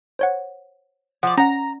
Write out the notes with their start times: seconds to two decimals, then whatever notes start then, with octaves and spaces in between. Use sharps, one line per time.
0.19 C5 C#5 F#5
1.23 F3 D5 F#5
1.37 C#4 F#5 A#5